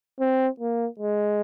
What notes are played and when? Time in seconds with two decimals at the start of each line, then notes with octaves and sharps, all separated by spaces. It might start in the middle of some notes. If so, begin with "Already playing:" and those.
0.20 C4
0.60 A#3
0.99 G#3